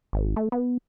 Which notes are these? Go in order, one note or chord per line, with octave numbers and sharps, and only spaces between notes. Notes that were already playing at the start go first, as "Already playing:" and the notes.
G#1
A3
B3